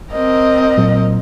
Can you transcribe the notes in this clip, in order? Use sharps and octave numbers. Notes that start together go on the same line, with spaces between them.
C4 A#4 D#5
A#2 F#3